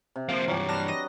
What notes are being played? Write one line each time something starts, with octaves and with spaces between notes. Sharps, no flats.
C3
F3 A#3 C4
G2 E3 F#3 G4
D4 B4 F6 A#6 E7
D#5 A#6